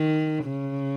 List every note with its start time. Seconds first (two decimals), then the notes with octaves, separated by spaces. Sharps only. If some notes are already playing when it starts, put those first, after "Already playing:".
Already playing: D#3
0.45 C#3